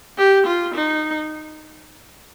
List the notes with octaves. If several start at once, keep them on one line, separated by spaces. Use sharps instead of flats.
G4
F4
D#4